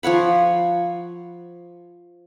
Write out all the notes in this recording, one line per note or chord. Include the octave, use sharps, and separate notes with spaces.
F3 C#5 F#5 B5